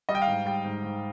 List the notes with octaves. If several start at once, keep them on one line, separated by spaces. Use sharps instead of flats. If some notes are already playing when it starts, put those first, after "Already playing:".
G3 D#5
G5
F5
G#2
G3 G5
G#2
G#2